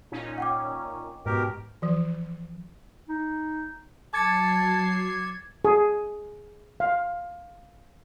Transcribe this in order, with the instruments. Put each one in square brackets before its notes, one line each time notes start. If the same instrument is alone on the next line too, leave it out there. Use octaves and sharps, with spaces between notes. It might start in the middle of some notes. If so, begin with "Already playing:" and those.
[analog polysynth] A#2 C#4 D#4
[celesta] F#5 G5 D6
[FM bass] G#2 [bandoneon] B2 G4 A#4
[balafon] E3 F3
[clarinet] D#4
[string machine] F#3 C7 [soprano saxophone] A5 [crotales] D6 A6 C#7 [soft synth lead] G#6
[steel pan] G#4
F5